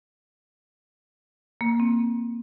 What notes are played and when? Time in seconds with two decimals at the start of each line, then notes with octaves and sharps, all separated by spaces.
1.61 A#3
1.80 C4